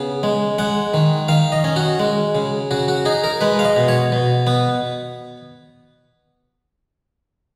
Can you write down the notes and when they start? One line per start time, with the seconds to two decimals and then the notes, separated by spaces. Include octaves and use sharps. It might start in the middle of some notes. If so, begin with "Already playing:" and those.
Already playing: C#3 B3
0.23 G#3
0.58 G#3 F#5
0.94 D#3
1.28 D#3 F5
1.52 D#5
1.64 C#4
1.76 F#4
1.99 G#3
2.35 C#3
2.71 C#3 F#4
2.88 F#4
3.05 D#4 G#4
3.24 A#4
3.41 G#3 B4
3.59 F5
3.65 D#5
3.76 B2
3.88 C#5
4.12 B2
4.47 B3